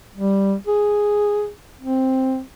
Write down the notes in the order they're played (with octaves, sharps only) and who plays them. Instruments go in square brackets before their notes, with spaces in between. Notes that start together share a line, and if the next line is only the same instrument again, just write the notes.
[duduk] G3
G#4
C4